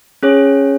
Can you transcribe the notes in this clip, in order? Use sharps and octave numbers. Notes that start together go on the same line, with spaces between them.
C#4 G#4 C#5